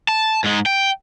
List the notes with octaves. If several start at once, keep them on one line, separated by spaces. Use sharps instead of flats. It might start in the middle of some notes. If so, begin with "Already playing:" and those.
A5
G#2 G#3
G5